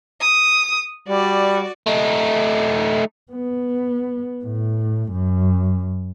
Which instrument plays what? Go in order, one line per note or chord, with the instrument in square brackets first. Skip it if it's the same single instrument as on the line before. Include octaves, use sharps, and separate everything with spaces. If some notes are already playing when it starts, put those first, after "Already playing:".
[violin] D#6
[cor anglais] G3 [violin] F#4 D5
[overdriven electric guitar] A3 D#4
[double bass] B3
A2
F#2